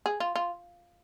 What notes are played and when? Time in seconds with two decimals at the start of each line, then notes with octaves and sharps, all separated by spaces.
0.06 G#4
0.20 F4
0.36 F4